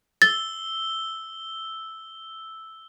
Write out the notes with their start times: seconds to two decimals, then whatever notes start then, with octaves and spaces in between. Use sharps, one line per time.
0.22 E6 A6 G7